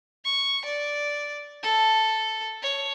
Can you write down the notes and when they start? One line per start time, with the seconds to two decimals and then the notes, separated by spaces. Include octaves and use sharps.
0.24 C#6
0.65 D5
1.63 A4
2.62 C#5